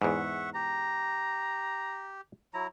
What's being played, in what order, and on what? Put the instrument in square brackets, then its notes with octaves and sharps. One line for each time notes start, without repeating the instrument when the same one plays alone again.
[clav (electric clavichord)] E2 G#2 [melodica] E5 F#5 C#6
[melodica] G4 [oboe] A#5
[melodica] F#3 E4 A#5